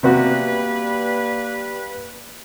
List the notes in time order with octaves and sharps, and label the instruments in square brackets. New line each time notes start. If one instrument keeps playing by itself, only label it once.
[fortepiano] C3 B3 F#4 [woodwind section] G3 A#3 B4